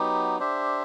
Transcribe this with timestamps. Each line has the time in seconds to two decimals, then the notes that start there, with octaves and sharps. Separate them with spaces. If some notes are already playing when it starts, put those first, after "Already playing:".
Already playing: F#3 B3 D#4 G4
0.39 D4 G4 C5 E5